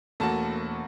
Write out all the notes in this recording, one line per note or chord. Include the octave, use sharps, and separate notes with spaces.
E1 A3 A#3 F#4 A5